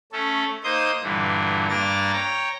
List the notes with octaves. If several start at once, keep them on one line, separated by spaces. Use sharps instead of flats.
A3 C#4 A4
A#3 D#4 C5 D#6 G6
G2 A#2 D3 E3
G2 A#3 D4 A#5 A6
C#5 G5 A#5